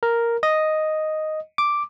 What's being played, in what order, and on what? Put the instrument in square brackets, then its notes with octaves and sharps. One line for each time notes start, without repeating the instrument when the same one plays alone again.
[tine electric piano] A#4
D#5
D6